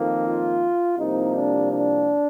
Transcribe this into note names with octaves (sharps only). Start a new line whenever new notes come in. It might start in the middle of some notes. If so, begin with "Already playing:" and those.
Already playing: F2 D#3 A#3
F4
C2 C3 F3 A#3 D#4
D4
D4